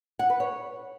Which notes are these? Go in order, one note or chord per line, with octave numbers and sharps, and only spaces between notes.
F#5
B4
C#5